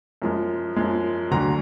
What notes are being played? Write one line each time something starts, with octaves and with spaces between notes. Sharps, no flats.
F#2 F3 G#3
F#2 F3 G#3
D2 D3 F#3 A#5